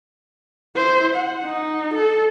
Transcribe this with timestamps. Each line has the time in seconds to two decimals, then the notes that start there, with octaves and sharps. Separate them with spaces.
0.76 E4 C5
1.16 F#5
1.45 D#4
1.95 A4